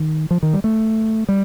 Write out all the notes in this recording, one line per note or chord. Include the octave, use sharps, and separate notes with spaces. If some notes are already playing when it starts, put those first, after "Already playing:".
Already playing: D#3
F3
D#3
G3
A3
G3